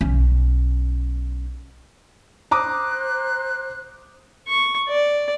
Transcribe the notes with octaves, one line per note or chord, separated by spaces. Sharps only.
B1 C#4
C5 A#5 D6 D#6 F#6
C#6
D5